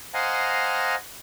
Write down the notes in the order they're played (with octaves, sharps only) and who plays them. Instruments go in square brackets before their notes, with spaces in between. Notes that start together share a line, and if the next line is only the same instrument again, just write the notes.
[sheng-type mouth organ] C5 D#5 F5 F#5 G#5 A#5